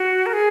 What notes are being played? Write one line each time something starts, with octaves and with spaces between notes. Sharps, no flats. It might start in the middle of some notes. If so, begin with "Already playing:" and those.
Already playing: F#4
A#4
G#4